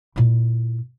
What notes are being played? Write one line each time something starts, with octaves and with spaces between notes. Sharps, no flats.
A#2 E4